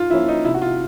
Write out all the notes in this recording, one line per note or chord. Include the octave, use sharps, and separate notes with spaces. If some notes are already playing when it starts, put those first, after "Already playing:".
Already playing: G#2 F4
F3 A#3 C#4 E4
D#4
C3 E4
F#4
F4